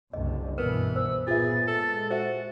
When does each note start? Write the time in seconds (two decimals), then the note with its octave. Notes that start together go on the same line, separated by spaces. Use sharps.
0.13 F#1 C2 D3 D#5
0.58 G2 B2 E3 B3 A#4 B4
0.96 C5 E6
1.27 A#2 B3 F4 G#4 E5 A6
1.68 G#3 A4
2.11 F#4 C5 E5